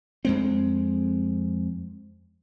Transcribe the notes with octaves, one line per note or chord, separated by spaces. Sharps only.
F2 G#3 C4